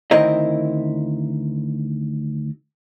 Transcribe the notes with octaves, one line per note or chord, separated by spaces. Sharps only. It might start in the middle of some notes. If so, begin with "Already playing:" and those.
D2 D#3 C4 E4 A#4 D#5